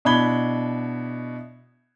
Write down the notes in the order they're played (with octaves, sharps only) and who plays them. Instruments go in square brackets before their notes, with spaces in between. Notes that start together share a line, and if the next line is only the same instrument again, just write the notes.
[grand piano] B2 D4 E4 B5 G#6 G7